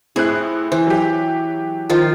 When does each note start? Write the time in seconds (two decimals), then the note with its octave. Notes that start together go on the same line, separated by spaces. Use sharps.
0.16 A2 C4 G#4 F#6
0.72 E3 C5
0.87 F#3 G4
1.90 D#3 F3 F4